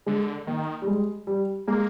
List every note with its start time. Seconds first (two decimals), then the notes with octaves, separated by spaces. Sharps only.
0.06 D3 G#3
0.47 D#3 A#3
0.82 G3
0.87 G#3
1.27 G3
1.67 G#3 A#3